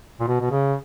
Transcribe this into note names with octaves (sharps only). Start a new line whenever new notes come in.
A#2
B2
B2
C#3